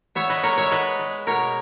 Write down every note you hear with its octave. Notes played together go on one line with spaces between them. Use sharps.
B3 C#5 E5
B4 D#5
G#3 A#4 C#5
C#5 E5
B3 B4 D#5
G#3
B2 A#4 C#5